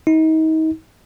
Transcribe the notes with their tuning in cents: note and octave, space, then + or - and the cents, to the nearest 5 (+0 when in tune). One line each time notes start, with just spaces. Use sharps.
D#4 +35